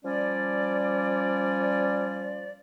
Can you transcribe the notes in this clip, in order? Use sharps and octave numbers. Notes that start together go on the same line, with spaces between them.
F3 G3 C#4 D5